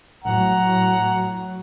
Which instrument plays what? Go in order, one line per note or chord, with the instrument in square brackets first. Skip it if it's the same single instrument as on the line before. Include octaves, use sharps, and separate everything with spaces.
[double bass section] A2 F#3 [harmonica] F#5 A#5